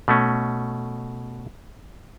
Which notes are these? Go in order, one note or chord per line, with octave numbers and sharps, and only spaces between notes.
B2 A3 C#4